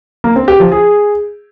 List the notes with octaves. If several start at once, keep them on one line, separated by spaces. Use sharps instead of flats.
A#3
C4
G4
F3
G#4